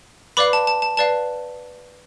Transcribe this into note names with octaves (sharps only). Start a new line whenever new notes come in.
B4 D5 F5 B5 D6
A5
A5
A5
B4 D5 F5 A5